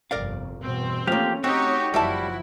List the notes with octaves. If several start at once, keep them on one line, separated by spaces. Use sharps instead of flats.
G1 C2 F2 A#4 D5 F5
E2 G2 B2 C4
F3 A3 A#3 C#4 G4 F5
C4 D#4 F#4 G4 C#5
F#1 D#3 F3 G3 E4 E5 A5